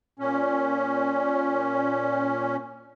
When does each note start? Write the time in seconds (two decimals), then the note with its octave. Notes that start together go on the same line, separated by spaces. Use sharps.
0.19 A#2 C#4